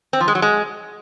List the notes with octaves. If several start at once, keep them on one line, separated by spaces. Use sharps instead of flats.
C4
F3
G#3
F#3
G#3